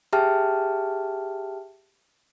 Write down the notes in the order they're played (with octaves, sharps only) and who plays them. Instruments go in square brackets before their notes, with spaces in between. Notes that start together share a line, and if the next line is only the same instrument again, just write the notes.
[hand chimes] G4 G#4 E5 G5 A5 F6